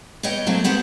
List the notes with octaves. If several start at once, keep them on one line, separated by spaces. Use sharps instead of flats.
B2 B3 C#5 D#5 G5
F#3 A3 A#3 C4
G#3 B3 C4 G4 B4 F#5